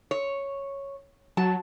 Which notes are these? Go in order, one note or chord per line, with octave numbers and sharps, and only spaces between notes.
C#5
F#3 A5